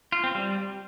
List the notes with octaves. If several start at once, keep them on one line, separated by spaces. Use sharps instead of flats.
F4
C4
G3